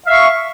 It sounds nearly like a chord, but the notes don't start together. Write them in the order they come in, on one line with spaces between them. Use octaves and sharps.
F5 E5 C#6